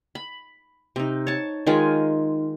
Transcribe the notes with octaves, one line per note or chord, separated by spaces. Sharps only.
B5
C3 D#4
C#5 A5
D#3 G#3 F4 G#5